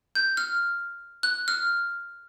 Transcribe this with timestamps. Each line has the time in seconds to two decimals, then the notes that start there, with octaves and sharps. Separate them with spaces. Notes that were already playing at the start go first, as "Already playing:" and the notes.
0.15 G6
0.37 F6
1.23 F#6
1.48 F6